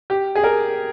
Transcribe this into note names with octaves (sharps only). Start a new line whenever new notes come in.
G4
G#4
A#4